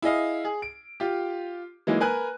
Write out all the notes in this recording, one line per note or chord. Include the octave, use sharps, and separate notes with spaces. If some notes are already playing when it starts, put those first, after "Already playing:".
E4 G#4 D#5 F5
G#4
D7
F4 G4
E3 F#3 G#3 A#3 D#4
A#4 B4 G#5 F#6